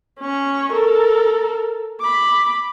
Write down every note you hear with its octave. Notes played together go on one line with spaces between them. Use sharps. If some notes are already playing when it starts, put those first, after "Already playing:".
C#4 C#6
A4 A#4
B5 D6